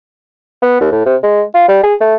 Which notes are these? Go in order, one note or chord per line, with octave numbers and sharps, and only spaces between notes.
B3
D#2
A2
C3
G#3
F4
G3
G#4
A3